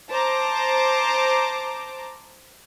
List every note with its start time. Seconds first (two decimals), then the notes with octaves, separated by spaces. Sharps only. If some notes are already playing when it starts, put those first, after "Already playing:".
0.10 C5 A5 A#5 D6